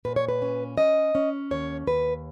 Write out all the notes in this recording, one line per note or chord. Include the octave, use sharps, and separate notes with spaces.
A#2 B4
C#5
B4
C#4
C#4 D#5
C#4
D#2 C#5
D#2 B4